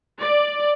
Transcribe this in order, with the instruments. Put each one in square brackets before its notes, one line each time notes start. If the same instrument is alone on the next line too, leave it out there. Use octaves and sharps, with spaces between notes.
[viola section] D5